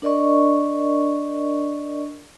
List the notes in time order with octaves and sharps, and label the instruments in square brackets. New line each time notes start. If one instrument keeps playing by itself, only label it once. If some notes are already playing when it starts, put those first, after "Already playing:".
[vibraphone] D4 A#4 D5 D#5 C#6